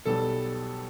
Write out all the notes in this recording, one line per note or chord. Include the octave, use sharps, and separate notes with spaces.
B1 B2 G3 A4